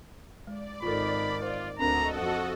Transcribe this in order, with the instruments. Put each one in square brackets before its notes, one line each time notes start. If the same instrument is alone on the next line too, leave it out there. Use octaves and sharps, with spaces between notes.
[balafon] G#3 [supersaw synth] D5
[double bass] G#1 D#3 [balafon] F4 A4 [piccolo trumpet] B5
[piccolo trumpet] F4 [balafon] C5
[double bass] D2 [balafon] C4 D4 A#4 [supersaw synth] F#4 A4 D#5 [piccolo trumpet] A#5
[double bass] F2 [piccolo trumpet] F#5